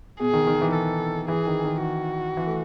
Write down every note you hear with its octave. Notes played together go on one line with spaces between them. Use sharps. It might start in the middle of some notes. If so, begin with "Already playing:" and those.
B2 G#4
D#3
D#3
E3
A4
E3 G#4
D#3
D#3
F#4
E3
A3